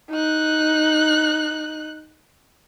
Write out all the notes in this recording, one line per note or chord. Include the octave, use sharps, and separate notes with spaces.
D#4 F#6